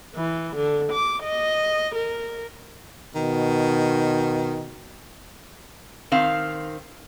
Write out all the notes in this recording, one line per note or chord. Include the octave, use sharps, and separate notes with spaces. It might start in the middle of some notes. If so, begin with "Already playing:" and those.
E3
D3
D6
D#5
A#4
B2 D#3
D#3 C4 F5